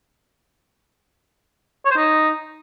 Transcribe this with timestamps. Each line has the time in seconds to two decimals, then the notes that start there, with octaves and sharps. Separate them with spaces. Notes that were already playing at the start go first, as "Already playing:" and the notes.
1.85 C#5
1.91 C5
1.96 D#4